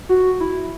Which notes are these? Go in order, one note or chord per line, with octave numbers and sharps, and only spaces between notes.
F#4
E4